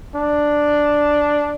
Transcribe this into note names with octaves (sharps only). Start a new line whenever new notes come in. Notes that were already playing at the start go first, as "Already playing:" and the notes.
D4